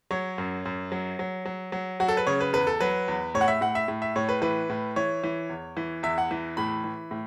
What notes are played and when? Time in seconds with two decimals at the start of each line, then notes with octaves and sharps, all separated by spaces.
0.11 F#3 C#5
0.38 F#2
0.65 F#2
0.92 F#3
1.19 F#3
1.45 F#3
1.72 F#3
2.00 F#3 F#4
2.09 A4
2.17 B4
2.27 C#3 C#5
2.40 B4
2.53 E2 B4
2.67 A4
2.80 F#3 B4
3.08 E2
3.34 A2 C#5
3.41 F#5
3.48 E5
3.61 A2 F#5
3.75 E5
3.88 A2
4.02 E5
4.16 A2 C#5
4.29 B4
4.42 E3 B4
4.69 A2
4.96 E3 C#5
5.24 E3
5.50 E2
5.77 E3
6.03 E2 E5
6.18 F#5
6.31 E3
6.57 A2 B5
6.84 E3
7.11 A2